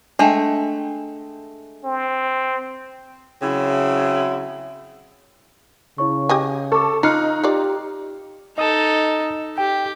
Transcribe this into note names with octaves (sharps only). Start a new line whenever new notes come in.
G#3 A3 D4 G5
C4
C#3 F#3 C4 E4
C#3 E4 C#5 C#6
G4 D#5 G#5
A4 C#6 D6
D#4 F4 F6 F#6 C#7
F4 G4 D5
D#4 A4 D#5 D#6
G4 G5